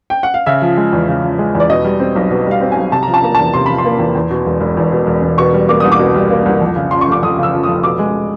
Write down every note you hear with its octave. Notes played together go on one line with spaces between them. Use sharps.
G5
F#5
F5
C#3 E5
F3
G#3
E2
C#3
F3
G#3
E2
D5
B2 D#5
G3
C4
B1
B2
G3 F5
C4
G#5
B1
C3 A5
F3 A#5
A5
A#3 A#5
E2 A5
C3 C6
F3 B5
C6
A#3
E2
E2
B2
E1
E1
E2
B2
E1
E1
B2 C#6
G3
A#3 D6
C2 D#6
D6
B2
G3
A#3
C2
F2
C#3
F3 C6
C#6
F1 D6
F2 D#6
C#3 E6
F3
F1 D#6
B2 D6
G#3